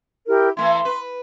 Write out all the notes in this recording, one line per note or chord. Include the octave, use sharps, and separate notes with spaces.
E4 G4 A#4
E3 A3 E4 C6
B4